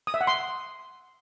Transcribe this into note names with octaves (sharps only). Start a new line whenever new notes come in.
D#6
E5
F#5
C6